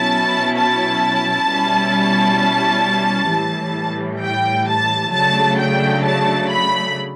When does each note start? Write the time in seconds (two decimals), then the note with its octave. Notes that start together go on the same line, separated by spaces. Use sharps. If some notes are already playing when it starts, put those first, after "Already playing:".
Already playing: B2 F#3 C#4 E4 A5
0.56 A5
1.48 B2 G3 C#4 E4
3.30 A2 E3 G3
4.22 G5
4.67 A5
5.12 C#3 F#3 A3 D4 A5
5.58 G5
6.04 A5
6.49 B5